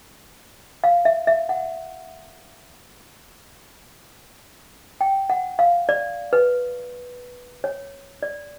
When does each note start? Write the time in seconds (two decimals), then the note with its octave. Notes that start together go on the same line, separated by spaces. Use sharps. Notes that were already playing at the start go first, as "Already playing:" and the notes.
0.84 F5
1.05 E5
1.27 E5
1.49 F#5
5.01 G5
5.30 F#5
5.59 F5
5.89 D5
6.33 B4
7.64 C#5
8.23 D5